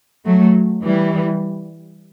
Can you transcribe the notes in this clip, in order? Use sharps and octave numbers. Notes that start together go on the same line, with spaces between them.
F#3 A3
E3 G3